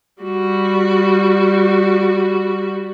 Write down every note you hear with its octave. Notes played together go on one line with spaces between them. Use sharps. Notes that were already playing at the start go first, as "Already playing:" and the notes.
G3 F#4